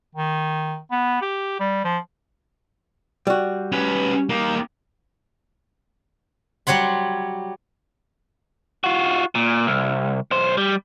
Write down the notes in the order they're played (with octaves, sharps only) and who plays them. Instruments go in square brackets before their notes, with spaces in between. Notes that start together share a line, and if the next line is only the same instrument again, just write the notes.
[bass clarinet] D#3
B3
G4
G3
F3
[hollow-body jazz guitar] G3 F#4
[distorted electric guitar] C#4 B4
A#3 G4
[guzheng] F#3 G3 C#5 F#5 C6
[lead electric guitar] F4 F#4
A#2
C2
B1 C5
G3